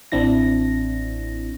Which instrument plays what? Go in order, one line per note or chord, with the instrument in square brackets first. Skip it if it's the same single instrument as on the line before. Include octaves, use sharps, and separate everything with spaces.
[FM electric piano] A1 C4 D4 E4 A#6